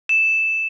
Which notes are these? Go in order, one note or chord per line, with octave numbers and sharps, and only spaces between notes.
E7